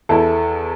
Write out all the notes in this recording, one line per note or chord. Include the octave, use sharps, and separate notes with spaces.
E2 E4 A4